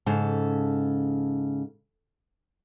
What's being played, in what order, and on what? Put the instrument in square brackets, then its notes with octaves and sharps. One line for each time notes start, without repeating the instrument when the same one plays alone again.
[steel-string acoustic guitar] G#2 C#3 A4